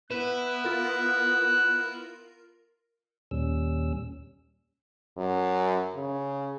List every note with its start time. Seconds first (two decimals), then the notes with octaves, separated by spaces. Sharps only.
0.11 B3 E4 B4 F#6
0.64 F4 A#4
3.31 D#2 A#2 G3 C#4 E6
5.17 F#2
5.95 C#3